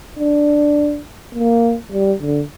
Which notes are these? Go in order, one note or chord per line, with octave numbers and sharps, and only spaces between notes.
D4
A#3
G3
D3